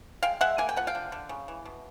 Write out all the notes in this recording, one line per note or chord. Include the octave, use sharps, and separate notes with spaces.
G#3 F5 G5
G#3 E5 F#5
A#3 G#5
G5
F3 F#5
F5 G5
D3
D3
C#3
E3
B2